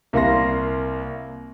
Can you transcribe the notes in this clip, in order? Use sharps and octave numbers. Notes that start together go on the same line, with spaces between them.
C2 A#3 F5 C6 A#6